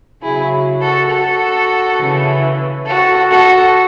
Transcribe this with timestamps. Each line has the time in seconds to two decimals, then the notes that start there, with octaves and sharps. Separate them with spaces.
0.22 C#3 F#3 E4 G#4
0.81 F#4 A4
1.10 F#4 A4
1.98 C#3 E3
2.86 F#4 A4
3.30 F#4 A4